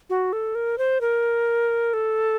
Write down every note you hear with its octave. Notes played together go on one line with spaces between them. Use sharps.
F#4
A4
A#4
C5
A#4
A4